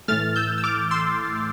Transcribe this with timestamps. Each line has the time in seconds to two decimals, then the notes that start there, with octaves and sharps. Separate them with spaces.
0.08 A2 E3 A3 F6 A6
0.36 E6 G6
0.58 E6
0.64 D6 F6
0.91 C6 E6